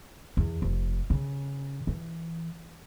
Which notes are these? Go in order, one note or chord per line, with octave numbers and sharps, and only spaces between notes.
E2
F1
C#3
E3